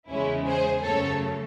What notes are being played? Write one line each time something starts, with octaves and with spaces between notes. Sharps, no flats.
E2 C#3 G#3 C#4 E4
G#4 C5
F#2 C#3 F#3 A3 A4 C#5